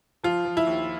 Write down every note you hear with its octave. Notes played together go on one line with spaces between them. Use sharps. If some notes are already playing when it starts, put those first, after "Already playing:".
F3 F4
F3
E4
D#2